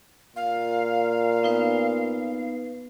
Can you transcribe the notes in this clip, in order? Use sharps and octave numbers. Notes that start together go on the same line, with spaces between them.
A#2 F5
B3 D#4 B4